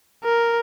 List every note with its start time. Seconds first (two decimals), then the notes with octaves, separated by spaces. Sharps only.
0.24 A#4